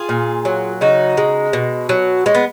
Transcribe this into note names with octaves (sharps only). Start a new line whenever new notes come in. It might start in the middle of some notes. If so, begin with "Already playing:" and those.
Already playing: F4 G#4
A#2
F#3
C#3 D#4 F#4
G#3
B2
F#3
G#3 C#4
B3